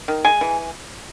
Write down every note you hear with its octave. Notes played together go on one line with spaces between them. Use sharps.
D#3
G#3 G#5
E3